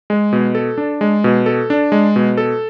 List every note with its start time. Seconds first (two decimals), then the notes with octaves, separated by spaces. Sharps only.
0.10 G#3
0.33 B2
0.55 A4
0.78 D4
1.01 G#3
1.24 B2
1.46 A4
1.70 D4
1.92 G#3
2.16 B2
2.37 A4